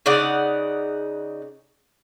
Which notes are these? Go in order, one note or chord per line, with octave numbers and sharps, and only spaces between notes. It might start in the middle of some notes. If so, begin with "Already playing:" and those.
C#3 D#4 D5 F#5